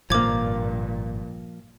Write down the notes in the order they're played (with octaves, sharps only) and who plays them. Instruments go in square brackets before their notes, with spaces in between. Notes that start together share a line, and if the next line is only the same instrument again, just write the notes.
[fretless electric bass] G#1 [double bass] G2 A#2 [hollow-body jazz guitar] F3 A#3 [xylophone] D6 G#6